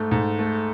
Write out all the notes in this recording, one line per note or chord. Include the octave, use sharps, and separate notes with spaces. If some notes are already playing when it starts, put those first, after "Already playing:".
Already playing: G#2 A3
G#2
A3